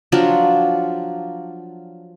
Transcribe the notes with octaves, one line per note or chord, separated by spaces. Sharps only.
F3 F#3 D4 F4